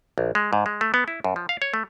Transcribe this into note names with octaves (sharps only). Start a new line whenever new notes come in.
A#1
G#3
G#2
G#3
A3
B3
E4
F#2
F3
F5
C#5
A3